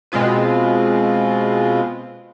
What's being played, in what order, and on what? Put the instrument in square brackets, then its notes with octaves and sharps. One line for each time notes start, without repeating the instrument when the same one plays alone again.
[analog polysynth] B2 G#3 C4 F4 B4